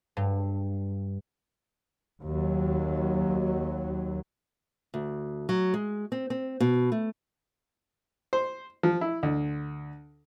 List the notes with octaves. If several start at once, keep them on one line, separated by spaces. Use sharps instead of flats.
G2
D#2 F#3
D2
F#3
G#3
C4
C4
B2
A3
C5
F3
E4
D2